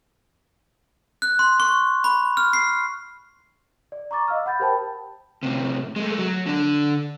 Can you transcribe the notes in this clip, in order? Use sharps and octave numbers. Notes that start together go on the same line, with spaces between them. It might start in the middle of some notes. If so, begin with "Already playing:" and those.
F#6
C6
C#6
B5
F6
C7
D5
A#5 C#6 D6 A6
D#5 F5 E6 F6
F#5 B5 G6 A6
G4 A#4 C5 G5 A5 B5
A2 C3
G#3 A3
F#3
D3 D4